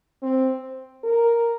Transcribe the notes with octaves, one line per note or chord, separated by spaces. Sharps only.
C4
A#4